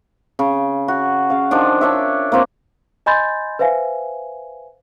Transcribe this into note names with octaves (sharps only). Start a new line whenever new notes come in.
C#3
F#4
C#3 F5
D#3 F3 D4
D4 C#5 E5
A#3 C4 F4 C5
D#5 G#5 B5 C6 G6 A6
B4 C5 E5 F5 G#5